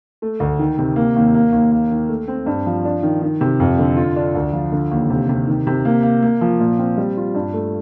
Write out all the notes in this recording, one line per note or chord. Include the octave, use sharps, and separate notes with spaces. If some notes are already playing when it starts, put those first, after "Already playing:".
A3
D2
D#3
C3
A#3
D#2
A#3
D#2
A#3
D#3
A3
C4
G2
F3
D4
D#3
D#3
C3
F2
D3
F4
D4
D2
F3
D3
D#2
C3
C3
D#3
C3
A#3
A#3
A#3
F3
A#2
C4
G3
F4
G2
A3